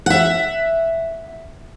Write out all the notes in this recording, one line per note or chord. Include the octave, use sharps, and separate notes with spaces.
E5 F#5